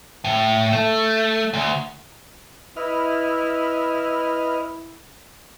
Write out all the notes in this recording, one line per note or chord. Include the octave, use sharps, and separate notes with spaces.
A2
A3
D2
E4 B4 D#5 F6